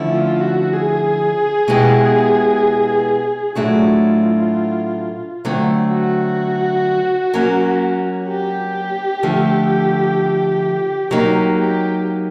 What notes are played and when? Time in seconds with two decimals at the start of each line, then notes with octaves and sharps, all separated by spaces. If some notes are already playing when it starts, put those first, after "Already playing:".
Already playing: D3 F3 A3 C#4 E4
0.10 F4
0.41 F#4
0.73 G#4
1.68 B2 G#3 B3 E4 G4
3.55 A2 F#3 A3 D4 F4 F#4
5.45 D3 F#3 A3 C4
5.92 F#4
7.33 F#3 A#3 C#4
8.28 G4
9.23 D3 F3 A3
11.11 F#3 A#3 D#4 G4
11.59 G4